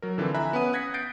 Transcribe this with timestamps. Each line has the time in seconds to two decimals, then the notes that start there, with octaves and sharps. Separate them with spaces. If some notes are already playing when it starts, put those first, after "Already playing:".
0.02 F#3 A#4
0.18 D3 E3 F3 C4
0.35 E5 G#5 A#5 B5 F#6
0.53 B3 C#4 B4 F#5 D#6 D#7
0.73 D#6 F#6 G#6 A#6 B6 C#7
0.94 G6 A6 A#6 C7 D7